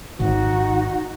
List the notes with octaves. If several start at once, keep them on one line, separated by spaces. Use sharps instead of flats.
G#1 D#4 F#4